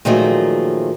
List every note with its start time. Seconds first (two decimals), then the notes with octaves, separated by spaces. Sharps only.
0.05 A#2 D#3 F3 F#3 A3 G#4